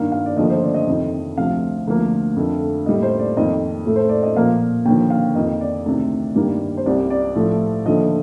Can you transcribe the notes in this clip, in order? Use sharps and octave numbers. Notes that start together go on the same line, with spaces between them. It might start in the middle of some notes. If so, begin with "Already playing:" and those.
Already playing: G2 D#3 A#3 F5
F5
D5
D#2 D3 F3 A3 D#5
C5
D5
D#5
F2 C3 D#3
D2 C3 F3 F5
D2 D3 F3 A#3
F2 D3 A3
A2 G3 A#3 D#5
C5
D5
F2 D#3 A#3 D#5
A2 A3
C5
D5
D#5
A#2 F3 A#3 F5
D#2 D3 F3 G5
F5
F2 D#3 A#3 D#5
D5
D2 C3 D#3
G2 D#3 G3 A#3
C5
C2 C3 G3 D5
D5
A2 F3 A3
D#2 D3 F3 A3 D#5